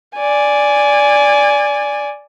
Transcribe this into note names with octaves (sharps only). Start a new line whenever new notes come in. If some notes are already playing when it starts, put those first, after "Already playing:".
D5 G#5